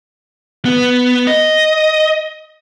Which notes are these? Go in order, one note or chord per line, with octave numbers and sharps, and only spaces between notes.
B3
D#5